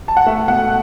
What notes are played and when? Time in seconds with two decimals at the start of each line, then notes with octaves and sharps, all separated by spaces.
0.08 A5
0.17 F#5
0.26 A3 E5
0.48 B2 F#5